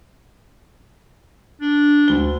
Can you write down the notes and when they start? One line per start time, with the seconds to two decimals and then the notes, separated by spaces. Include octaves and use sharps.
1.61 D4
2.08 D2 G7